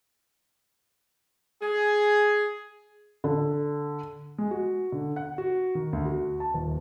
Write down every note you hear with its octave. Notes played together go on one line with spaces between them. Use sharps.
G#4
D3
G#3
F#4
D3
F#5
F#4
D#3
D2
F#4
A5
D#1